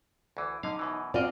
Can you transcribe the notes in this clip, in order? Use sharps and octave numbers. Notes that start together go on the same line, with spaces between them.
D2 E3
D3 D#4 F5
F#2 B2 E3
F#2 C4 F4 D5 D#5